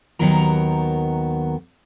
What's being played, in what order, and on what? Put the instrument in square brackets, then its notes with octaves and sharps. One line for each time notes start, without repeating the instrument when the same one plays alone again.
[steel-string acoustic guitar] D#2 D#3 F#3 B3 A#4 A#5